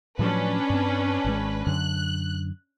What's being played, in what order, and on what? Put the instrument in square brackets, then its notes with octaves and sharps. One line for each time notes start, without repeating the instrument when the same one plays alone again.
[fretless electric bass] A2 F3 F#3 [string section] C#4 D4 B4
[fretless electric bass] G2 C4
G#1 C3 G#3
[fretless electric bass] F#2 D3 [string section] F#6